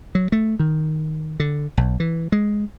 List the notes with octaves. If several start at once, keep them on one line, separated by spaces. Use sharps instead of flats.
F#3
A3
D#3
D3
B1
E3
G#3